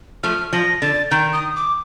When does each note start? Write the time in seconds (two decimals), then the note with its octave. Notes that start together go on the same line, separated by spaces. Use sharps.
0.23 F3 A3 F6
0.53 F3 A#6
0.82 D3 A6
1.11 D#3 G6
1.33 D#6
1.56 D6